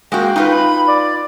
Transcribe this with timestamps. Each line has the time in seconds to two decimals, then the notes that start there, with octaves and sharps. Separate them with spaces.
0.12 G#3 A#3 F#4 G5
0.36 D#4 F4 B4
0.51 B5
0.87 D5